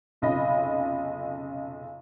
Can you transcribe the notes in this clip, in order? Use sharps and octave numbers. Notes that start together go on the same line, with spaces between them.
F1 B1 C#3 F4 D#5 B5